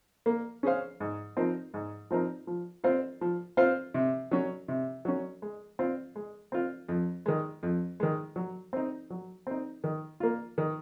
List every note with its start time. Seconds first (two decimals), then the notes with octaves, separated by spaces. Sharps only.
0.26 A#3
0.63 C#4 G#4 C5 F5
1.00 G#2
1.37 F3 C4 D#4 A#4
1.74 G#2
2.11 F3 C4 D#4 A#4
2.47 F3
2.84 C4 F4 C5 F5
3.21 F3
3.57 C4 F4 C5 F5
3.94 C3
4.31 F#3 C#4
4.68 C3
5.05 F#3 C#4
5.42 G#3
5.79 C4 F4
6.16 G#3
6.52 C4 F4
6.89 F2
7.26 D#3 G#3
7.63 F2
8.00 D#3 G#3
8.36 F#3
8.73 C4 D#4
9.10 F#3
9.47 C4 D#4
9.84 D#3
10.20 A#3 F4
10.58 D#3